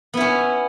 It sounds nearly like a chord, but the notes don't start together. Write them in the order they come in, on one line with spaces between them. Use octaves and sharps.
B3 E4 C#4